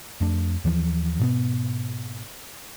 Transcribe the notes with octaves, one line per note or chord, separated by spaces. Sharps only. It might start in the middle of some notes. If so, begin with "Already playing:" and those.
F2 A3 D4
D#2 E3 F3
G#2 B2 B3